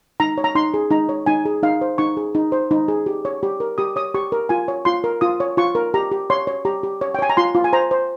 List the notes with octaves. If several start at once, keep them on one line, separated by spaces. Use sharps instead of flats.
D#4 A#5
C#5
A#5
D#4 C6
G#4
D#4 A#5
C#5
D#4 G#5
G#4
D#4 F5
C5
D#4 C#6
G#4
D#4
C5
D#4
G#4
G4
C#5
G4
A#4
G4 D#6
C#5 D#6
G4 C#6
A#4
F4 G#5
C#5
F4 C6
A#4
F4 D#6
C#5
F4 C#6
A#4
G4 A#5
G4
C#5 C6
C#5
G4 A#5
G4
C#5
G5
C#5 G#5
A#5
F4 C6
F4
G#5
C5 A#5
C5